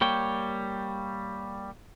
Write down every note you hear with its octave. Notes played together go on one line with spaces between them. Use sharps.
G3 A#3 C#5 G5